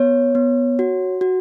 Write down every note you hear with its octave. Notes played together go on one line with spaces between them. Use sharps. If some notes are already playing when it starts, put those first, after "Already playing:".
Already playing: B3 C#5
B3
F#4
F#4